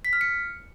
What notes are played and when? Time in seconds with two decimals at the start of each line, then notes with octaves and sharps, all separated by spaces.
0.05 B6
0.13 F6
0.21 C#7